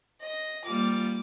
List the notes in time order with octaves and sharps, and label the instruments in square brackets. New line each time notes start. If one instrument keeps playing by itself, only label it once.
[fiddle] D#5
[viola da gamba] G3 A#3 F4 [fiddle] D6